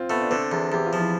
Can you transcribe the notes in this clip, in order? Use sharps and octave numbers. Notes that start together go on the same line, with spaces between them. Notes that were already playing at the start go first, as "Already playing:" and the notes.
Already playing: C4 F4
A3 B3
D4
D3 C4
E2
E2 G4
F4
F3
E4